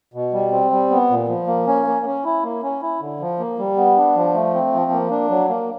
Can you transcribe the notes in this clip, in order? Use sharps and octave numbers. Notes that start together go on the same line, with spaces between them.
B2
G3
C4
G3
B3
A#2
F3
A#3
C#4
A#3
C#4
E4
A#3
C#4
E4
D3
F3
A#3
G3
B3
D4
F3
A3
C4
F3
A#3
D4
F#3
A#3